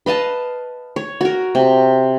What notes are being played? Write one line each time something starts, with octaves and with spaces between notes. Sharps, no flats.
B4 D#5 F5 A5
C#5
F#4 A#4
C3